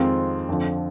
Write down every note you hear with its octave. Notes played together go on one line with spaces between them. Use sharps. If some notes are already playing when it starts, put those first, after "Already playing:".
Already playing: F2 D#3 G#3 C4 F4
F2 D3 F3